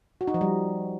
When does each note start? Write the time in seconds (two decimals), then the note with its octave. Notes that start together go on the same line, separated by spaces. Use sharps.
0.21 F#4
0.27 D#4
0.34 F3
0.41 G3